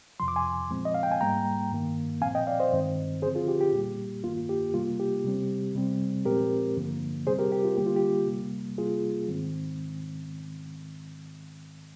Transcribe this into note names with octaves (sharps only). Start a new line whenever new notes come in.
F2 C3 F3 C6
D6
G#5 C6
A#2 F3 G#3 C4
D#5
F5
G5
G#5
G#2 G3 A#3 G5 A#5
G2 D#3 A#3
A#2 F3 C4 F5 G#5
D#5 G5
D5 F5
C5 D#5
G2 D#3 G#3 C4
D3 F3 C4 G#4 C5
F4 G#4
G4
G4
A#2 G3 A#3
G2 D#3 A#3 F4
G4
C3 G3 A#3 F4
G4
C3 G3 C4
C3 G3 C4
A#2 F3 G#3 C4 G4 A#4
G2 D3 F3 A#3
C3 G3 C4 G#4 C5
G4 A#4
G4
F4
D3 G3 A#3 G4
F4
G4
C3 G3 A#3
C3 G3 A#3 F4 G#4
G#2 D#3 G#3 C4